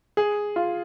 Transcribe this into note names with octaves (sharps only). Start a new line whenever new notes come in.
G#4
F4